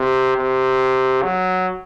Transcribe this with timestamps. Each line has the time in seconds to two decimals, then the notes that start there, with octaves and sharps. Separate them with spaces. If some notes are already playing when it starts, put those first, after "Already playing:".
Already playing: C3
0.37 C3
1.23 F#3